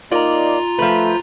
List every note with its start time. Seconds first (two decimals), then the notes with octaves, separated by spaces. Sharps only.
0.12 A#3 D#4 F4 D5 A#5
0.79 F3 A3 B4